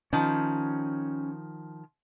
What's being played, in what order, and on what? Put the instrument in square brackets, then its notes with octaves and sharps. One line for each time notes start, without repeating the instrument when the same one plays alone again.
[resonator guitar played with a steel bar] D#3 F3 [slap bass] C#4